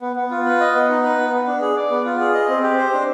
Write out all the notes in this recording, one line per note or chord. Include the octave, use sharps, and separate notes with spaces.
B3
B3
F4
B4
D#5
B3
D#4
B4
B3
B3
D4
G#4
D5
B3
F4
G#4
D#5
C4
G4
C5
D4